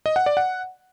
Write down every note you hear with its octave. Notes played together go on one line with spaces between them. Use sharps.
D#5
F#5
D5
F#5